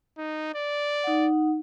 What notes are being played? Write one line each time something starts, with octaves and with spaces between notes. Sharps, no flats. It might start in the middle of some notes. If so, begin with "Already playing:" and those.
D#4
D5
D#4 F#5